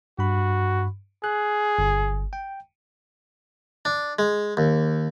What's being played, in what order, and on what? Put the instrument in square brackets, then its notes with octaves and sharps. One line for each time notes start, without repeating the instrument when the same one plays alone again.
[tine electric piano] G2 B5 [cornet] F#4
[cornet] G#4 [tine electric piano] F#6
[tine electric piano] G1
G5
[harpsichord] D4
G#3
D#2